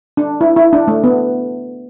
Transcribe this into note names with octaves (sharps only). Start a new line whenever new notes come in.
D4
E4
E4
D4
A3
B3